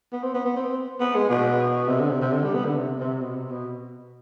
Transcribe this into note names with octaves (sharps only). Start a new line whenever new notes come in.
B3
C4
B3
B3
C4
B3
G#3
B2
C3
D3
C3
C3
D3
G3
B3
D3
C3
C3
B2
C3
B2